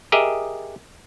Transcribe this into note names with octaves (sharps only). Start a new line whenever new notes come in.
G4 G#4 A#4 D#5 E5